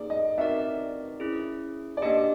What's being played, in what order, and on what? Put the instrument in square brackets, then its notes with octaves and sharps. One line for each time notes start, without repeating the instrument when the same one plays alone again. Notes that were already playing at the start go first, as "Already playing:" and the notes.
Already playing: [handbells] A#3 D#4 G#4 [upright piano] D5
[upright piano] D#5
[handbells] C4 D#4 F#4 A#4 D5 [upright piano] E5
[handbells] C#4 E4 G#4
[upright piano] D5
[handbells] A#3 D4 G4 [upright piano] D#5